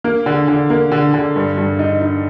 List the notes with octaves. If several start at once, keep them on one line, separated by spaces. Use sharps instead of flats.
A#3
D3
D3
A#3
D3
D3
G2
G2
D#4
D#4